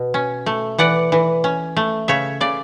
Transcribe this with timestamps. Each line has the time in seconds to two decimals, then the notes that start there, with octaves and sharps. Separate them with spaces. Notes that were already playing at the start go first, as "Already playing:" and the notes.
Already playing: B2
0.14 C#4
0.46 A3
0.78 E3 D5 F#5
1.12 E3
1.44 C#4
1.77 A3
2.08 C#3 C#5 E5
2.41 C#3 D5